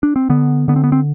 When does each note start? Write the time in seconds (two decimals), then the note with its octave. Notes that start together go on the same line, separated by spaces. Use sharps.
0.03 D4
0.16 C4
0.29 D3 B3
0.68 D3 B3
0.76 C4
0.84 B3
0.92 C4